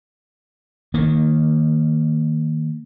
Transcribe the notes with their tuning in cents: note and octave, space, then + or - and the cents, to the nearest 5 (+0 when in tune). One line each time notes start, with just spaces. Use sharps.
D#3 +0 A#3 -15